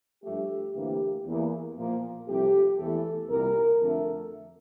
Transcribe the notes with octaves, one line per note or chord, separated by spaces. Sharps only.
G2 F3 A3 G4
D2 C3 E3 A#3 G4
E2 E3 A#3
A#2 F3 A#3
C2 C3 F3 A3 G4
E2 E3 A3 A4
C2 A#2 G3 A#4
F2 D3 A3 A4